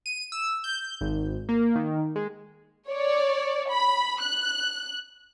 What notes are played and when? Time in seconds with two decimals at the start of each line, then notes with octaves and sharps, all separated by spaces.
0.06 D#7
0.32 E6
0.64 G6
1.01 G#1
1.49 A#3
1.75 D#3
2.16 G#3
2.89 C#5 D5
3.70 B5
4.21 F#6